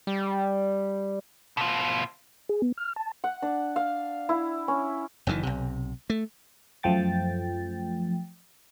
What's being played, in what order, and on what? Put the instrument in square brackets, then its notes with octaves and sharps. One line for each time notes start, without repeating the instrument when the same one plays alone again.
[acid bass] G3
[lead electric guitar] B2 F4
[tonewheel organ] G#4
B3
F6
A5
[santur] F#5
D4
F5
E4
C#4
[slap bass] F#1 F#2 D#3 E3
B1 C3
A3
[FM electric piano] F#2 F3 A3 G5 A6